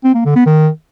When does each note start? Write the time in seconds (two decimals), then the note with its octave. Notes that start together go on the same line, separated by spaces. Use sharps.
0.04 C4
0.14 A#3
0.25 D3
0.35 B3
0.46 D#3